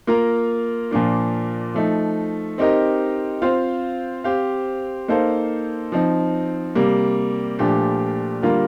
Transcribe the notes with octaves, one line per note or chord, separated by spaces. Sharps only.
A#3 F4 A#4
A#2 F3 A#3 D4
F3 A3 D#4
C4 D#4 G4 A#4 D#5
C4 F4 C5 F5
C4 G4 C5 F5
A#3 D#4 A4 C5 F5
F3 C4 D#4
C3 G3 A#3
A#2 F3 A3 D4 G4
D3 G3 A#3 F4 A#4